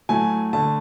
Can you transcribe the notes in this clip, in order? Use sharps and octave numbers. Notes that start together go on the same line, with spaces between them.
A2 F#3 A3 G#5
D3 A3 A5